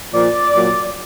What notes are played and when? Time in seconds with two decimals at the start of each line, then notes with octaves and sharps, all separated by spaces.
0.14 A#2 F3 D5
0.55 A#2 F#3